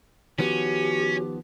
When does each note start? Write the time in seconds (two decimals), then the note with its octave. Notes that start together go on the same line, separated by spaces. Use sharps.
0.39 D#3 F3 B3 C#4 F#4 G4